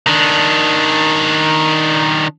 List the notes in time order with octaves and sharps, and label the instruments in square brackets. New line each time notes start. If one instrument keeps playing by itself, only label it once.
[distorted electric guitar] D#3 D4